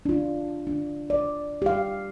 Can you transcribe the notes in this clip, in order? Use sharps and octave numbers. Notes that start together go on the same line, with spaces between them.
D4 F4
D4
D5
G4 F5